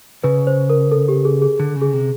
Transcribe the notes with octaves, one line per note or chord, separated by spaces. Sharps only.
C#3 B4
C5
A#4
A4
G4
G#4
G#4
D3
C#3
G#4
C3